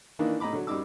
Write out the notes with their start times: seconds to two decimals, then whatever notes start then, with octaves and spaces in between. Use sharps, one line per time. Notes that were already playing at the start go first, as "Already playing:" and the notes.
0.19 D#3 E3 A#3 D4 D#4
0.40 A2 D#5 A#5 B5 D6
0.53 D3 F#3
0.67 F#2 G3 D#4 D6 E6